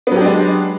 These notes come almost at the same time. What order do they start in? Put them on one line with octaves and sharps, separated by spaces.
B3 F#3 G4 D4 G#3